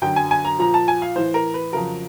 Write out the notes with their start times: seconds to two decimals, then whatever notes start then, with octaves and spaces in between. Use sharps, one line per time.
0.02 F#2 D3 F#3 G5
0.16 G#5
0.31 G#5
0.45 A#5
0.59 A#2 F3 A#5
0.74 A5
0.88 G#5
1.02 F5
1.16 A2 E3 C5
1.34 A#4
1.54 B4
1.72 F2 C#3 F#3 A#4